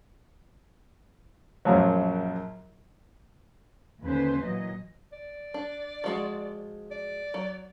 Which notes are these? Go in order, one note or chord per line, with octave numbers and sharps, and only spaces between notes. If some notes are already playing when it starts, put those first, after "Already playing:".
A#1 F#2 F3 F#3
D#2 D3 C#4 B4 C5
A#2 E3 F#3 D#5
D5
D4
F3 G#3 F#4
D5
F#3